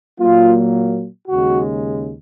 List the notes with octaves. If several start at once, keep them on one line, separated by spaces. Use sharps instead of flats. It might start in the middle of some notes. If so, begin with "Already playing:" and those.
A#2 F#3 A#3 F4
D#2 C#3 G#3 F#4